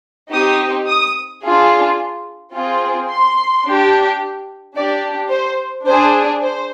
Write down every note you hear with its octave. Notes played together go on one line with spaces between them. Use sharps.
C4 D#4 G4 D#6
D#6
D4 F4 G#4
C4 F4 G#4
C6
D4 G4
D4 G4 D5
C5
D4 G#4 C5
C5